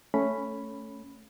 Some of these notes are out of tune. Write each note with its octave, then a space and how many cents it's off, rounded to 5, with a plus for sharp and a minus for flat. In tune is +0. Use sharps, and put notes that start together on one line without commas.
A3 +0 C#4 +0 B5 +0